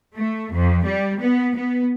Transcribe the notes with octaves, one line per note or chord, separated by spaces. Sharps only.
A3
F2
G3
B3
B3